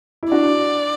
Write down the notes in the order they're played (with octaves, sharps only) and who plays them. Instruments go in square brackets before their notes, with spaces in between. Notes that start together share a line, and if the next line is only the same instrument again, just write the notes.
[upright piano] E4
[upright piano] D4 F#4 [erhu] D5